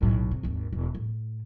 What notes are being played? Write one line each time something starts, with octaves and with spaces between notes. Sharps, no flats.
B1 A2
C3
G#1 D#2
E1
A2